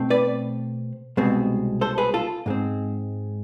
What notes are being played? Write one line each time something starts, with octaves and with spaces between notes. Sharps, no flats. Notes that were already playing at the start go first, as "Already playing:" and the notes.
Already playing: B2 A3 C4
B4 D5
C2 B2 G#3 C4
A4 C5
G#4 B4
F4 A4
G#2 G#3 C4